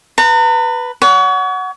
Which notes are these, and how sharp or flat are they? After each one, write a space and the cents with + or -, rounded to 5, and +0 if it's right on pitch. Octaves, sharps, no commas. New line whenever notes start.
B4 +0 A#5 -40
C#5 +35 F#5 +0